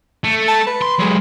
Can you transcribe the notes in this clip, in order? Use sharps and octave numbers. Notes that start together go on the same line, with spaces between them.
A3
A5
B4
C6
F#3 G#3